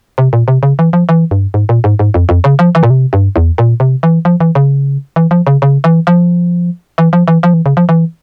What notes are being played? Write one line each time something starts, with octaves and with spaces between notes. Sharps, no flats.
C3
A#2
C3
C#3
E3
F3
E3
G2
G#2
A#2
G#2
G#2
F2
F2
C#3
F3
E3
A#2
C3
G2
E2
A#2
C3
E3
F3
E3
C#3
E3
F3
C#3
C#3
E3
F3
E3
F3
E3
F3
E3
C#3
F3
E3